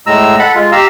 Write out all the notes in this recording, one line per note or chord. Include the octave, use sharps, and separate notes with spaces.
A2 G#3 A#5 E6
A4 F#5 B5
G#3 F4
G4 F5 A#5 E6